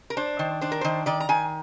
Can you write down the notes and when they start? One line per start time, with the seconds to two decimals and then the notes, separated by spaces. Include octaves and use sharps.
0.10 A#4
0.17 D4 C5
0.39 D#3
0.61 D4 C5
0.72 A#4
0.81 D#3 C5
1.06 D#3 D5
1.20 A#5
1.29 D#3 G#5